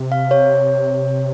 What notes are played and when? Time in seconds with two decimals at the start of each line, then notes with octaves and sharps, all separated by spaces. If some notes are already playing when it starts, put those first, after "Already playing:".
Already playing: C3
0.12 F5
0.31 C#5